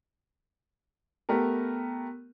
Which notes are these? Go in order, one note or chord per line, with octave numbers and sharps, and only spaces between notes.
A3 B3 G4 A#4